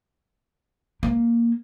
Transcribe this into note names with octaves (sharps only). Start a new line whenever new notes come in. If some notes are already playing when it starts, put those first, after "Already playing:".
A#3